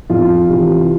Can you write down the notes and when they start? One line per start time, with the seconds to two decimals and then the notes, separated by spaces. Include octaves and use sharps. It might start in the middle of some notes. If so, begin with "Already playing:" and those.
0.10 F2 F4
0.49 C3 E3